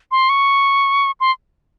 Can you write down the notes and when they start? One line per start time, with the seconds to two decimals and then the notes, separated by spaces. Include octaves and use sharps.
0.12 C6
0.29 C#6
1.20 C6